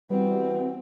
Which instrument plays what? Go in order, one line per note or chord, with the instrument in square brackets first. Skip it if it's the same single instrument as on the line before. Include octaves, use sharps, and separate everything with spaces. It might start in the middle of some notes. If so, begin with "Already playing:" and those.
[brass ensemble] E3 F#4 [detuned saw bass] G3 [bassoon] B3 [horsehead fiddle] C4